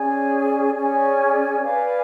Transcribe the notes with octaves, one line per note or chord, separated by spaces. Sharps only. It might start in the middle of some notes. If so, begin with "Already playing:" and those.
Already playing: C#4 G#4 D5 G#5
C#4 G#4 D5 G#5
B4 D5 F5 G#5